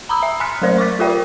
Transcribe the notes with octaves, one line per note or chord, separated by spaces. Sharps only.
A#5 B5 D#6 E6
E5
G#5 C6 F6 F#6 B6 C#7
F#3 A3 A#4 C5 D5
C#6 D6 A6 B6
F4 G4 A#4 D5 E5 G5